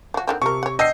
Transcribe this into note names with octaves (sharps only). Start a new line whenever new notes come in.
F3 F#4
D3 D#3 C4
C3 F3 A#4 C#6
C#5 F#5
B3 D4 G4 D#5 E6 G6 C7